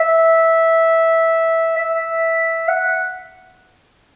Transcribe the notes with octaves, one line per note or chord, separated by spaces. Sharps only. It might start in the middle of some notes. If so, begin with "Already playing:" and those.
Already playing: E5
E5
F#5